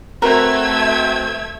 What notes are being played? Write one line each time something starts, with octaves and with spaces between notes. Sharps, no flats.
A3 C4 F#4 A#4 B4 E6 G#6